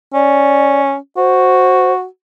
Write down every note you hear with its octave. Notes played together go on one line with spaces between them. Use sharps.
C#4 D5
F#4 C5